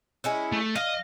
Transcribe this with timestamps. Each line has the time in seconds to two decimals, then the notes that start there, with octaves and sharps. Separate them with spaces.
0.24 G#3 C#4 E4
0.53 A3
0.75 D#5 F5